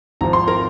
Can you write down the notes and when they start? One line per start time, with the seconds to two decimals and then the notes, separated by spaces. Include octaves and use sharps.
0.21 G#1 G#2 F3 A#5
0.33 C6
0.48 A#4 A#5